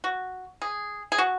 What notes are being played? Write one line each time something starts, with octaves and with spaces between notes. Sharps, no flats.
F#4
G#4
G#4
F#4